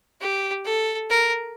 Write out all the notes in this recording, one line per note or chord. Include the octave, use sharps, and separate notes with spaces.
G4
A4
A#4